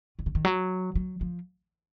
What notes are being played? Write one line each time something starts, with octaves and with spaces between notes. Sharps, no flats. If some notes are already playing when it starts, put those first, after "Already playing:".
D#3
C#3
D#3
F#3
F#3
F3